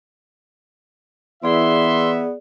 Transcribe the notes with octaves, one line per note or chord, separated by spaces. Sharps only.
E3 B3 G#4 D5 E5 C6